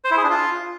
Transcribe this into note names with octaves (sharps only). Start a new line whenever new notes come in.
C5
E4
G#4
D4
F4